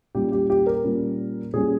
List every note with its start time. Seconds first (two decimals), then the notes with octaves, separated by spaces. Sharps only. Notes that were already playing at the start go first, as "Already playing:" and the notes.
0.15 A#2 G3 C#4 G4
0.32 G4
0.50 G4
0.67 A#4
0.84 A#2 G3 C#4
1.54 A#2 G3 C#4 G#4